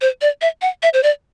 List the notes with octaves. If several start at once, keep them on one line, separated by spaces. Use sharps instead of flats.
C5
D5
E5
F#5
E5
C5
D5